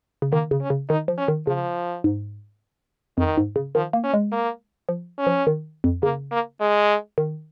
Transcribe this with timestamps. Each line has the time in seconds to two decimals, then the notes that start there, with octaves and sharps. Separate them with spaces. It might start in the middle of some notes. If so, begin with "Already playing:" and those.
0.22 C#3
0.32 D#3 A#3
0.51 C#3
0.61 C#4
0.70 C#3
0.90 D#3 D#4
1.08 F3
1.18 C#4
1.28 D#3
1.47 C#3 F3
2.04 G#2
3.18 F2 D#3
3.37 G#2
3.56 C#3
3.75 D#3 F3
3.93 A#3
4.04 C#4
4.14 G#3
4.32 A#3
4.89 F3
5.18 C#4
5.27 F3
5.47 D#3
5.84 F2
6.03 C#3 A#3
6.32 A#3
6.61 G#3
7.18 D#3